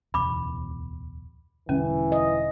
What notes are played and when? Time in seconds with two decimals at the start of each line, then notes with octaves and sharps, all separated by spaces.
0.14 D1 E2 B2 B5 D6
1.69 E1 D3 E3 G3 C#4
2.12 D#5